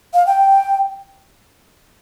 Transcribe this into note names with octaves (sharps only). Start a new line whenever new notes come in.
F5
G5